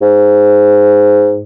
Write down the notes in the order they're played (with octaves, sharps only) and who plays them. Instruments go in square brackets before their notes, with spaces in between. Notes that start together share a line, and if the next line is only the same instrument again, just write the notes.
[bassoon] G#2